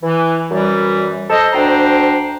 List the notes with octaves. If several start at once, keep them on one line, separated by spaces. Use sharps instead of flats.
E3
F#2 E3 G3
A4 C5 D#5
D2 D4 C5 G5 A#5